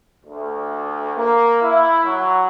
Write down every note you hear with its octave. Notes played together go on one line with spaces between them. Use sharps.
D2
A#3
E4
F#3